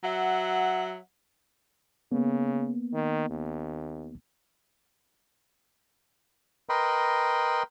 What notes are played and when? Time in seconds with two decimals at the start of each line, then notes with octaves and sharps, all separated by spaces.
0.04 F#3 E5 F#5
2.12 C#3 A#3 B3
2.93 D#3
3.30 D#2
6.69 A#4 B4 D#5 G5 B5 C6